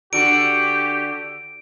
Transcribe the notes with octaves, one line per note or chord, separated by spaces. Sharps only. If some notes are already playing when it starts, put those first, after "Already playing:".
D3 F#4 G4 D7